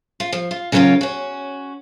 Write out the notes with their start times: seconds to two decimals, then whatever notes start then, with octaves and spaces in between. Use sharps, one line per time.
0.20 F4
0.32 F3
0.51 F4
0.72 C#3 F#3 B3 C#4 F4 A#4
1.01 C#4 F#4